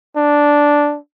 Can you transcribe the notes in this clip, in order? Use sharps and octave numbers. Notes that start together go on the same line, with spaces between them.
D4